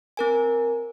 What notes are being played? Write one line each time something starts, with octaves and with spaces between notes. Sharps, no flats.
C4 A#4 G#5